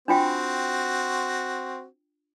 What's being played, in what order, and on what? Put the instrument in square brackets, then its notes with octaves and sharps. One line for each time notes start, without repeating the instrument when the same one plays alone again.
[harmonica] C4 F#4 [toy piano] D4 F4 G5